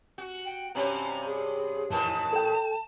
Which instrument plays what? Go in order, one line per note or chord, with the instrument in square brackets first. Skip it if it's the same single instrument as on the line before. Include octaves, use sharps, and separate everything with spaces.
[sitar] F#4
[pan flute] G5
[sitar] G2 C3 C#4 [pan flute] A#5
[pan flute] G#4
[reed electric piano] F2 [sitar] A2 D#3 E3 [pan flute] A5
[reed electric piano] A4 G5